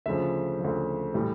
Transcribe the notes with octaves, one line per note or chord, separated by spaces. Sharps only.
D2 C#3 F3 E5
D2 C#3 F3
A2 E3 G3